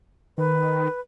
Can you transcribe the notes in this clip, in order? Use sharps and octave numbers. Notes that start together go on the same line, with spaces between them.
D#3 B4